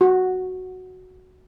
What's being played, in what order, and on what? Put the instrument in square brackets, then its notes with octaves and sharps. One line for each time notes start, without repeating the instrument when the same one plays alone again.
[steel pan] F#4